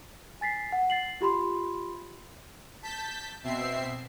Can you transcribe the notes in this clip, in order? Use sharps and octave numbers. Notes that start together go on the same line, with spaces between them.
G#5 A6 B6 C7
F#5
A6 C7 F#7
F4 G4 B5 C6
A5 G6 B6
B2 C4 E5 C7